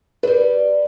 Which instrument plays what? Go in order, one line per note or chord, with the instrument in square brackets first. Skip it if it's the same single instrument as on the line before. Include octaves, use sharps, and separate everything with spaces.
[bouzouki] F#3 G3 [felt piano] B4